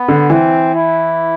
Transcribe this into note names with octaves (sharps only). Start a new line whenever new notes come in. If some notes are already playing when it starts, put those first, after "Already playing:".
Already playing: B3
D3
E3 C4
E4